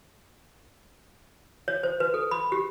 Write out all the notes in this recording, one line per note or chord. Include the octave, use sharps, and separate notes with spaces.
C#5
C5
B4
A4
B5
G4